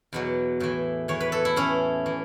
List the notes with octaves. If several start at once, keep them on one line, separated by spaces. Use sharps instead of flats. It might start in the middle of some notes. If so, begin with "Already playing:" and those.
E2 B2 F#3
A2 E3
E2 E3 C#5
B4
A4
E4
A2 E3 C#4
E3